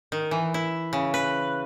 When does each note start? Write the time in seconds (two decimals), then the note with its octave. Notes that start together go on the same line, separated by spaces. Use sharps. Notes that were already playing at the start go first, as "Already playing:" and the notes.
0.12 D#3
0.31 E3
0.54 E4
0.93 C#3
1.14 B4